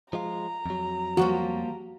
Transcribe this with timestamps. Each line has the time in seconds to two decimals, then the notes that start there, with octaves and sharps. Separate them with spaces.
0.13 F3 G#3 F4 A#5
0.66 F2 F#3
1.17 F3 G3 A#3 F#4